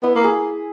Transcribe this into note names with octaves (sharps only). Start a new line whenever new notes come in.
B3 E4
A#3
G#4